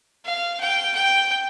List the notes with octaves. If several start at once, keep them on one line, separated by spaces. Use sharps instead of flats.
F5
G5
G5